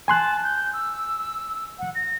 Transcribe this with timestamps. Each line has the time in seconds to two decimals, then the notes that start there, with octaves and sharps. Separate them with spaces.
0.08 G#5 A5 C6 F#6
0.44 G6
0.73 E6
1.79 F#5
1.95 A#6